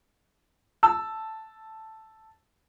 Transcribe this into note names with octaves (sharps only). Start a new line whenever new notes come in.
A5 E6